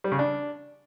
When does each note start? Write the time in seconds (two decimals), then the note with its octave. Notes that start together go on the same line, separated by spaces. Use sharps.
0.04 G3
0.12 C#3
0.19 D4